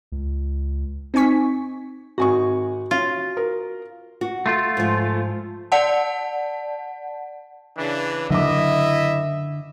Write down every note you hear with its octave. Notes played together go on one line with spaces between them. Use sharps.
C#2
C4 D#4 G#5 C#6 B6
G#1 F#4 G#5 C#6
C#4 F4
A#4
F#4
A3 F4
G#2 F3
D5 F#5 A5
C#3 E3 D4
F#1 D3 E4 D#5 E5 D6